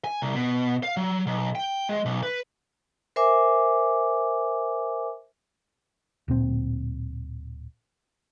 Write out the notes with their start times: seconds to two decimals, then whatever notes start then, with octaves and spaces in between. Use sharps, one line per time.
0.04 G#5
0.22 C2
0.35 B2
0.83 F5
0.97 F#3
1.27 B1
1.55 G5
1.89 G#3
2.05 B1
2.23 B4
3.16 A#4 C5 E5 G#5 D6
6.28 D1 A#2 C4